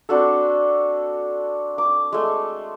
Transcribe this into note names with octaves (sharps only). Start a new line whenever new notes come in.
C4 D4 F#4 A4
D6
G#3 A3